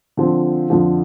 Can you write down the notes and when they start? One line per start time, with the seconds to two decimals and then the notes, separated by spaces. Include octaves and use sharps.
0.17 D3 F3 C4
0.70 F2 D3 F3